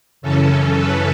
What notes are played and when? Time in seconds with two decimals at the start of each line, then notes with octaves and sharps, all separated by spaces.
0.22 F#2 C#3 E3 C#4 A4
0.77 B4